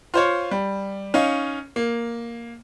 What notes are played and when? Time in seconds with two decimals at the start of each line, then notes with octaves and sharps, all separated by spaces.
0.14 F4 C5 C#5
0.51 G3
1.14 C#4 D#4 C#5 F5
1.76 A#3